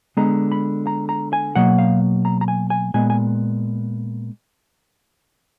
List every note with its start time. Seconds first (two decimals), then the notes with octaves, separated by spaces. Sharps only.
0.17 D3 G#3 B3 A#5
0.52 B5
0.87 A#5
1.09 A#5
1.33 G#5
1.55 B2 F#3 A#3 F#5
1.78 F5
2.25 A#5
2.41 A#5
2.48 G#5
2.70 G#5
2.94 A#2 G#3 B3 G#5
3.10 G#5